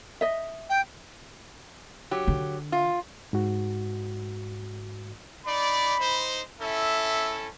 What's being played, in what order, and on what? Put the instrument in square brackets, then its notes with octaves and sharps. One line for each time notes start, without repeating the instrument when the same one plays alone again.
[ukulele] D#5 E5
[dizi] G5
[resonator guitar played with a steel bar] F#3 G4
[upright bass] D3
[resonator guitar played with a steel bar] F4
[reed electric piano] G#2 F#4
[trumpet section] D#4 D5 [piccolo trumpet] B5
[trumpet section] D#4 C5
[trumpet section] C#4 E4 A4 [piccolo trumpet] E5